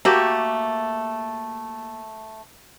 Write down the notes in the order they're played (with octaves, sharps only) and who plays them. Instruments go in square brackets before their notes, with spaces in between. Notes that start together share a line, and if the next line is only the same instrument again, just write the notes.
[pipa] A3 [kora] A#3 F#4 G4